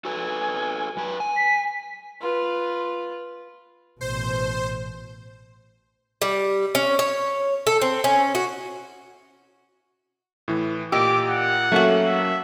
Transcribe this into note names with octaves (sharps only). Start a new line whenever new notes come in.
F#4 A4 B4 G#5
F#2 B4
G#5
B6
F4 B4
A1 B2 C5
G3
C#4
C#5
A4
C4
C#4
F#4
A2 E3
A#2 G4 D#5 D6 E6
F#5
F#3 A3 A#3 C#4 F#4
E5